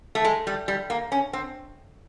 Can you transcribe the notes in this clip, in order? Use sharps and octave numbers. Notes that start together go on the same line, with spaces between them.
A3
G#3
G3
G3
A#3
C#4
C4